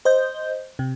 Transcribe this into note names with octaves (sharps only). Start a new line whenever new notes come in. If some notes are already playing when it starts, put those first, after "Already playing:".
C5 D#5 G6
C3